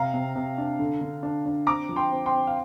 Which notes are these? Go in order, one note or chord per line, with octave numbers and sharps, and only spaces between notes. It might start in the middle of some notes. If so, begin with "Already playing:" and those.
Already playing: C3 F5 A#5
C3
C3
D4
D3
D3
D4
D4
C4 A#5 D6
F3
G5 C6
C4
G5 C6
C4
F5